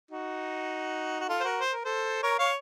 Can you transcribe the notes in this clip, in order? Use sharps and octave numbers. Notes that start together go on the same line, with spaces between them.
D#4 F#4
F#4
F4 A4
C5
F#4 A#4
C5
A#4
A4 C5
A#4 C#5
C#5 F5